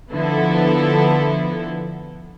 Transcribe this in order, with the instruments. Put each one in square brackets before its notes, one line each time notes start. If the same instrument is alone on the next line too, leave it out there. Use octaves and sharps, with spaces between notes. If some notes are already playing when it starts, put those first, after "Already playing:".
[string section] D3 F3 B3 E4 A4